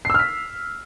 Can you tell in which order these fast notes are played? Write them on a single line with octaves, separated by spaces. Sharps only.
C7 E6 F6 B6